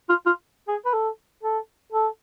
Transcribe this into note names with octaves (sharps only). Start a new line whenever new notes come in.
F4
F4
G#4
B4
A4
A4
A4